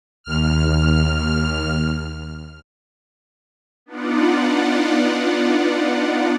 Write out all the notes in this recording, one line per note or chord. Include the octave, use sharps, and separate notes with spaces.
D#2 F6
B3 D4 D#4 F4 D5 F#5